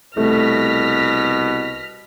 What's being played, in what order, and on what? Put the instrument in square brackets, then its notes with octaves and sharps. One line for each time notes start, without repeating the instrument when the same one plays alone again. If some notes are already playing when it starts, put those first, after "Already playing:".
[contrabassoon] C2 [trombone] B2 [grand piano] A3 [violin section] F6 A#6 B6